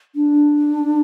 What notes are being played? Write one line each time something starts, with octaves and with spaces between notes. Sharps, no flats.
D4